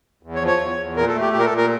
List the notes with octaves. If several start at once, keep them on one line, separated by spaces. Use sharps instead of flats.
E2
C#5
F3
C#5
E2
E2
A#2 A#4
A4
A3
G4
A#2 G4
A#4
A4
A#2
A#4